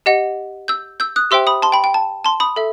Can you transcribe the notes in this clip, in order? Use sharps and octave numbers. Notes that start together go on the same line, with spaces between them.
G4 D#5 F#5
E6 G6
E6 G6
D#6 F#6
G4 C5 E5 G5 C6 E6
B5 D#6
A5 C6
G5 B5
G5
A5
A5 C6
B5 D#6
A4 E5